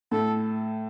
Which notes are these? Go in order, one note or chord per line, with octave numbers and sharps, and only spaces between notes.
A2 A4